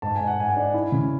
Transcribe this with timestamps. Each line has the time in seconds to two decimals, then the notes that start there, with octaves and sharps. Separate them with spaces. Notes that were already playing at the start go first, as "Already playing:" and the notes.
0.02 G#2 A5
0.16 G#5
0.21 G#2
0.27 F#5
0.38 G#2 G#5
0.56 D4
0.74 E4
0.92 C#3